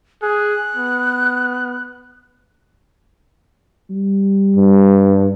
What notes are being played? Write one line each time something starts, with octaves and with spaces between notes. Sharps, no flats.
G#4 F#6
B3
G3
G2